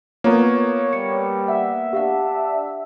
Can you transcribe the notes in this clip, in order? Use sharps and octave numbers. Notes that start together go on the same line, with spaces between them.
A#3 B3 F4 A#4 C#5 A#5
G3 C#7
E5 F#5
D4 G4 F5 F#5